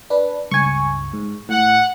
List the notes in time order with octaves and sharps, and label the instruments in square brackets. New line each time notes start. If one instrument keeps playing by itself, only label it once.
[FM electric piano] D4 B4
[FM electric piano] C#2 G2 [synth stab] G#5 C#6
[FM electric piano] G#2
[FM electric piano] A2 [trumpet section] F#5